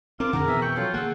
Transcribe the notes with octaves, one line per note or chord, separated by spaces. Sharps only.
C4 F4 A#4 D6
F2 D3 G#4 A#4 F#5
B2 E3 B3 C4 E5
G5 C#6 C#7 F#7
F3 F#3 F4 A4
D#3 A#3 G#4 F#5 E6